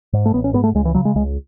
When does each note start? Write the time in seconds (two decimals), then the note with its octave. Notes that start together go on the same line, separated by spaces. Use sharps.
0.13 G#2
0.26 A3
0.34 A1 B3
0.44 C#4
0.54 G#2 B3
0.64 A3
0.75 C#2 G#3
0.85 E3
0.95 C#3 F#3
1.05 G#3
1.16 C#2 G#3